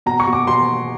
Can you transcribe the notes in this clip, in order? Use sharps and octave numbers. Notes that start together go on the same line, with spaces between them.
B2 A#5
C#6
B2
D6
B2 C6